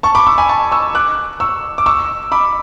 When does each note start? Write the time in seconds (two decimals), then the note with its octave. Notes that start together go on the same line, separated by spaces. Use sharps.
0.03 A5 C#6
0.15 B5 D6
0.27 C#6 E6
0.38 G#5 B5
0.49 A5 C#6
0.72 C#6 E6
0.95 D6 F#6
1.40 C#6 E6
1.78 D6
1.86 C#6 E6
2.32 B5 D6